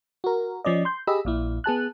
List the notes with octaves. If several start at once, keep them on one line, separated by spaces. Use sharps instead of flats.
F#4 A#4
F3 C#4 D5 D#5
C6 G6
G4 G#4 D#5 B5 E6
A#1 A#2 E4
B3 G#4 A5 F#6